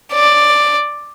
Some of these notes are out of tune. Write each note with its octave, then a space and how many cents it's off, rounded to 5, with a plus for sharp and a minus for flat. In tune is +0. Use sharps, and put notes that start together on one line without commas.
D5 +5